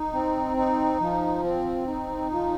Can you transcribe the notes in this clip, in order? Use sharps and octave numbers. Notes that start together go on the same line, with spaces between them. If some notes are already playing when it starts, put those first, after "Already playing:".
Already playing: D#4
C4
D#4
F3
C4
D#4
F3